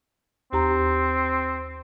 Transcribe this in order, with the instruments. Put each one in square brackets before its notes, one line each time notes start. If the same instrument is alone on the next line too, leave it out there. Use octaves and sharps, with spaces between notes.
[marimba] D#2 G4 A#5 [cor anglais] C4